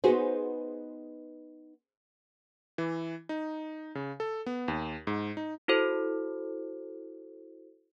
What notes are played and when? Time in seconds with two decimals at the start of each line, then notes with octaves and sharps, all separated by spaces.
0.04 B3 D#4 F#4 G#4 B4 C5
2.78 E3
3.29 D#4
3.95 C#3
4.20 A4
4.46 B3
4.68 D#2
5.07 G#2
5.37 D#4
5.68 E4 F#4 A4 C5